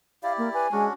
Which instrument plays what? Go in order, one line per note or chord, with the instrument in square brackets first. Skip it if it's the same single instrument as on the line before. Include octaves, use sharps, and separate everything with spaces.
[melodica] E4 G4 D5 [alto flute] F5
[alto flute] A#3
[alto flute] B4 [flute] G#5
[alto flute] G#3 [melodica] C#4 D4 F#4